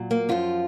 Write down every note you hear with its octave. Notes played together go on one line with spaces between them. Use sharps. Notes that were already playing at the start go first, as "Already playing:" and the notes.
Already playing: A#2 F#3
A#3
F#2 F3 F4